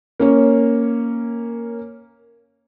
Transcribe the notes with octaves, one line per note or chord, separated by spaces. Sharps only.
A#3 C#4 C#5